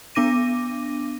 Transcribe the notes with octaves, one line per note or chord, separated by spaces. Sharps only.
B3 D4 D6 A#6 D#7